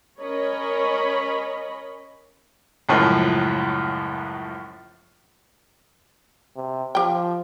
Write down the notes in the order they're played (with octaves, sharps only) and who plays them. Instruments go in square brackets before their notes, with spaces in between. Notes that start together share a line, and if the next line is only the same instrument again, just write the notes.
[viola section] C#4 A#4 C#5 D#5 B5
[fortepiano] C#2 F#2 A2 F3
[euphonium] C3
[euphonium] F3 [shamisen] G4 G5